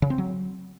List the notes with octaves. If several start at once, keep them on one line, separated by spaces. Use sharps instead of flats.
C#3
C4
F#3